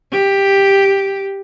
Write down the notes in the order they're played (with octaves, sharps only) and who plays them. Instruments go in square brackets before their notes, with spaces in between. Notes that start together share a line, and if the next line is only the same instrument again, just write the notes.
[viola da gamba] G4